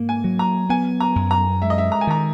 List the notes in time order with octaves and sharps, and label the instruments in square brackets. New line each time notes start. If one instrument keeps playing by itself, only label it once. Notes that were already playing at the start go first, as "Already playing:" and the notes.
Already playing: [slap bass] G#2 A#3
[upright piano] G#5
[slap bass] F#3
[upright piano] A#5
[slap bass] B3 [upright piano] G#5
[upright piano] A#5
[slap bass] F#2
[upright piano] A#5
[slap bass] G#3 [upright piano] E5
[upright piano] D#5
E5
A#5
G#5
[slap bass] D#3 [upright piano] A#5